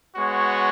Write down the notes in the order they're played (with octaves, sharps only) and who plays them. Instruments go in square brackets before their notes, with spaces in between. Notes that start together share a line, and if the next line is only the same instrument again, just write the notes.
[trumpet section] G#3 B3 F#4 C#5